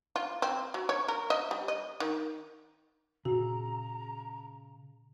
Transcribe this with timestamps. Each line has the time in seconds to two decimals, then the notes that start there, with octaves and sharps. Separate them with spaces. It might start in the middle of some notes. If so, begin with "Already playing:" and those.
0.16 F4
0.42 C4
0.74 F#3
0.89 C#5
1.08 A#4
1.30 D#5
1.51 G3
1.68 D#5
2.00 D#3
3.25 A#2 C#3 F#4 A#5